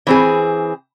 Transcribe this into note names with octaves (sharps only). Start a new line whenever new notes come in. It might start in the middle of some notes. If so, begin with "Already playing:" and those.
E3 C4 G#4